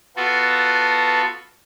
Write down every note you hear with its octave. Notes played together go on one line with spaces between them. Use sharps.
B3 F4 F#4 A4